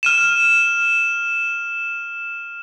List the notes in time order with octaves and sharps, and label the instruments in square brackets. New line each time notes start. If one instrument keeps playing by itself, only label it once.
[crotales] F6 D#7 E7